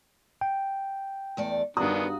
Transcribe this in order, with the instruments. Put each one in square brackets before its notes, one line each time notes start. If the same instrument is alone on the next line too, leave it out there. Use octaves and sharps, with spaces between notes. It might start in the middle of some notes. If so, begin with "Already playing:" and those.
[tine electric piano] G5
[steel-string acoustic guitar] E2 A3 D5
[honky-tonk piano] G2 A#5 D#6 [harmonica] D#3 B3 D4 [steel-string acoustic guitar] F#4